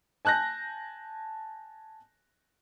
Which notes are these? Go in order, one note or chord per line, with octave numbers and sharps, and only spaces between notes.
G#5 A5 F#6 G6 A#6